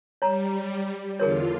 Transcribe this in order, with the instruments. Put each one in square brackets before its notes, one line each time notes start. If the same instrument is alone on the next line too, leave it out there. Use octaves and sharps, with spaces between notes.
[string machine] G3 [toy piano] C#5 A#5
[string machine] E2 D3 F4 [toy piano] G#4 A#4 C#5